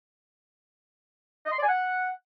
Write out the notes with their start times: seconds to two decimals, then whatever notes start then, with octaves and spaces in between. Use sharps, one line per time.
1.46 D#5
1.51 C6
1.57 D5
1.63 G#5
1.68 F#5